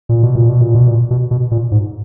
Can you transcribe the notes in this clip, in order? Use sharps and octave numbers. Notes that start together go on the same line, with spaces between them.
A#2
B2
A#2
B2
A#2
B2
A#2
B2
B2
A#2
G#2